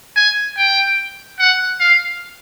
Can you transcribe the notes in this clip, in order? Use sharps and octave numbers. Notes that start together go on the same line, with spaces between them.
G#5
G5
F#5
F5